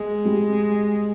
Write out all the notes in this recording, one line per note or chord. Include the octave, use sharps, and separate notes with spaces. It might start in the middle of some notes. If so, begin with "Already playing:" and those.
Already playing: G#3
G3